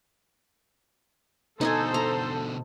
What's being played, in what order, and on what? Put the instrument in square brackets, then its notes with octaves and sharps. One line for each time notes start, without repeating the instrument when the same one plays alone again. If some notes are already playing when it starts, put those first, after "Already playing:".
[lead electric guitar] B2 D3 [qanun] D#4 D#5 G#5 [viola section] A4 C5
[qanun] A#5